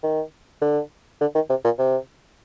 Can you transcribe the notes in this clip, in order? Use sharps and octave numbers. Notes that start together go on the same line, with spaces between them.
D#3
D3
D3
D#3
C3
A#2
C3